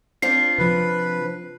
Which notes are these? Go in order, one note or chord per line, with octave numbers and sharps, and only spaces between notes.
C4 D4 F4 C7
C3 F3 B4